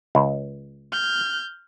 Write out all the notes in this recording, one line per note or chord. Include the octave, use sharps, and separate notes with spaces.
C#2
F6 G6